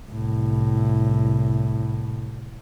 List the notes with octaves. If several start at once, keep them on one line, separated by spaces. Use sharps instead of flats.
C2 A2